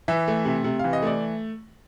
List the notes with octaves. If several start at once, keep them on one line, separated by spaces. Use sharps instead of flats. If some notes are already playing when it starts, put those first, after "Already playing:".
E3 E5
A3
C3
C3
E3 F5
D#5
A3 D5